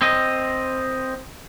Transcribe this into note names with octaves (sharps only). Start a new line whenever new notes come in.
C4 D#5